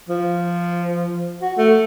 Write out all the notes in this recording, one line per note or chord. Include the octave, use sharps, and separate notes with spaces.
F3
F#4
A3